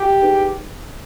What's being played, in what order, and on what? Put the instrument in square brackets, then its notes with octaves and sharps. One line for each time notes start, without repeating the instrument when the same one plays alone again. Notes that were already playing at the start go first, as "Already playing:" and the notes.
Already playing: [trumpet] G4
[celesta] D#4 G#4 B4